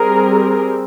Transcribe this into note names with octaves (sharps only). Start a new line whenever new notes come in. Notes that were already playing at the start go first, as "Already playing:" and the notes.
Already playing: G3 C4 G#4 A#4